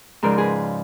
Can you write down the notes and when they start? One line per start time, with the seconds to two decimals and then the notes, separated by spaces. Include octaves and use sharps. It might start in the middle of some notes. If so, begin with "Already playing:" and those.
0.23 G#2 C#3 F3 A#4 D5
0.38 G#4 B4